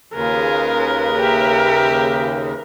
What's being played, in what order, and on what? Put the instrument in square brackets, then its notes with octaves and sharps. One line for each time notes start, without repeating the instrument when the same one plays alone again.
[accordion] D#2 C#3 [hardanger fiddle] F4 G#4 [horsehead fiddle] A#4 B4
[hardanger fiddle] G4 E5